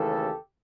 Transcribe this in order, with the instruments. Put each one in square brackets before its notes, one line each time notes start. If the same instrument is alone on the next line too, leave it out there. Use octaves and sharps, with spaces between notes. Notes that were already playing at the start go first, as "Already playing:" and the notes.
Already playing: [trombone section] D#2 C#3 E3 A3 G4 A4